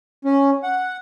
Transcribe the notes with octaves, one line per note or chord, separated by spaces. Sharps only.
C#4
F#5